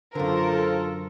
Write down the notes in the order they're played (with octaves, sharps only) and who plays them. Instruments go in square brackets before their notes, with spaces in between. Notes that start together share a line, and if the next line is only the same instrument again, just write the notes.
[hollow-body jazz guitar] F#2 D3 [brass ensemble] F4 A4 [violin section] A#4 [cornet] C5